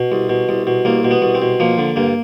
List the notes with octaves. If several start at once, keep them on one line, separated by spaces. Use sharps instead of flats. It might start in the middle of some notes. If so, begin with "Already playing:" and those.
Already playing: B2
C2
B2
C2
B2
C2 A#3
B2
B3
C2
C4
B2
F3 A#3
D3
G2 A#3